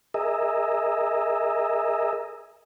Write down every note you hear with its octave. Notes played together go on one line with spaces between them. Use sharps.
G#4 A#4 D#5 E5